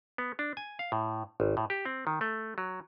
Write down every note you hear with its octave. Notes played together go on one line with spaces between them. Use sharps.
B3
D4
G#5
F5
A2
G#1
A2
G4
C4
D#3
A3
F#3